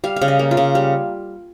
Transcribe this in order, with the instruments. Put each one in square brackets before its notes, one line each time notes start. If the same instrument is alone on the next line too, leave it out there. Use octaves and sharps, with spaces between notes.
[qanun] G3 F5
F5
C#3
D#5
A#3
F4
C#3
G3